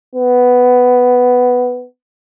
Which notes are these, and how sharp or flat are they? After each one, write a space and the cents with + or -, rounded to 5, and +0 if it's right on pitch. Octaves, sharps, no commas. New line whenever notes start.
B3 +5